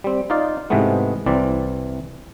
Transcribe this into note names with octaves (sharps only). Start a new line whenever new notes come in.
G3 C4
D#4 F4 D5 F5
G#2 C3 E3 G#3 A3 B3
C2 E3 C4 D5